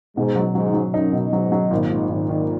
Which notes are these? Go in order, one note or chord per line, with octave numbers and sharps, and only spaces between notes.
G#2 B2
F#3
G#2 F#3
F#3
F#2 D#4
B2
G#2 F#3
F#3
G#1 A#2
G#2
G#1
D#3